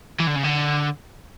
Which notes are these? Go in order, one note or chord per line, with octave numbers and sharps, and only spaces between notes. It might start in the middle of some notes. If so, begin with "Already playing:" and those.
E3
D3
C#3
D3